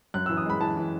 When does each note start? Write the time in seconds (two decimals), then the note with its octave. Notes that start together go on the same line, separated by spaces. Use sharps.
0.14 F#2 F#6
0.26 E3 E6
0.37 D#6
0.46 G#3 B5
0.61 E3 A5
0.77 E3